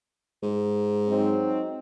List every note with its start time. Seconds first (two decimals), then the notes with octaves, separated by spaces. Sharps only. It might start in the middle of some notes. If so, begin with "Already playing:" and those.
0.43 G#2
1.08 F#3 C4 D#4